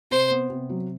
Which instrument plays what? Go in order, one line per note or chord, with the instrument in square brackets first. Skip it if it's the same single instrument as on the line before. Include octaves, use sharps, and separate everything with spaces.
[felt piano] C3 [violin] C5
[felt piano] B3
C3
F#3